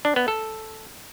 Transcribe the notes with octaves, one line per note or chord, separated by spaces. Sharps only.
D4
B3
A4